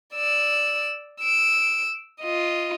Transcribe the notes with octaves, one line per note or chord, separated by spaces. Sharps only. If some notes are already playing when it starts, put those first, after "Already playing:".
D5 E6
E6 D7
F4 D#5